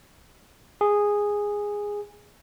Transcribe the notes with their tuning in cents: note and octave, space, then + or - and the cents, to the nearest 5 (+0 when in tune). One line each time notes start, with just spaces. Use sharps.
G#4 -10